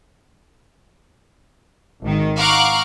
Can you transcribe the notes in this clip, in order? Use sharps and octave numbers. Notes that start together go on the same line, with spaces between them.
G#1 D#3
F5 F#5 A#5 C#6 D6 F#6